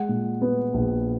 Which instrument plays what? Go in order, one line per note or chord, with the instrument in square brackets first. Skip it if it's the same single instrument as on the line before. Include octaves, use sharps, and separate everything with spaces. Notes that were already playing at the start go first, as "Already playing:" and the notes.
Already playing: [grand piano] G#3 F#5
A#2
B3
A#1